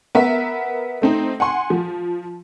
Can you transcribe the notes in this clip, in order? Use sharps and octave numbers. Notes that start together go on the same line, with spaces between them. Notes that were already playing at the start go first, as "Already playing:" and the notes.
B3 A#4 E5
A3 C4 D#4
F#5 G#5 C6
F3